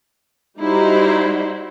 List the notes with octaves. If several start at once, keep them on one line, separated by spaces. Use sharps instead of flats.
G3 D#4 E4 F#4 C5